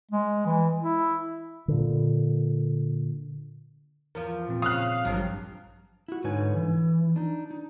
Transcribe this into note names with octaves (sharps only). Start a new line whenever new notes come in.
G#3
E3
E4
A#2 D3
E2 F3 A#4
A#2 C4
C#3 F5 D#6 F#6
A1 G2 D#3 F3 F#3
E4 F#4
G#2 D3 D#4 B4 C#5 G#5
E3
D4 D#4
D#4